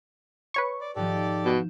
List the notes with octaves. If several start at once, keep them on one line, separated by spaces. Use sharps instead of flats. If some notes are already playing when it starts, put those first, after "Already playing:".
B4 C#5 C#6
D5
G#2 D#3 F3 G4 A4 D5
B2 G6 E7